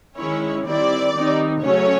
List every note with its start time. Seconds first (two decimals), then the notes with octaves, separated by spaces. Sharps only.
0.18 D#3 G#3 C#4 E4 C#5
0.66 D#3 G3 C4 E4 D5
1.15 D#3 G3 C4 D#4
1.62 C#3 F#3 A3 C#4 C#5